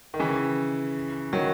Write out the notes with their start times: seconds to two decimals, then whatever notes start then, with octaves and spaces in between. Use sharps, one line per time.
0.14 D#3
0.19 C#3 E3
1.33 D#3 F#3